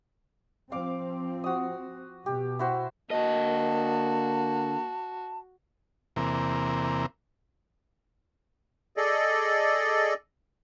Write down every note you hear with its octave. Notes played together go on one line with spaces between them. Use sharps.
F3 C4 F5 D6
F#4 D#6
B2 G4
E4 F#4 C5
D3 A#3 F#4 D#5 A5
E2 C3 A#3
G#4 A4 D5 D#5